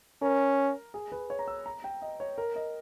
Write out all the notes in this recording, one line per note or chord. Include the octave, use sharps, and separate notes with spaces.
C#4 A#4
G#4
B4
C#5
A#5
E6
A#5
G5
D#5
C#5
A#4
D#5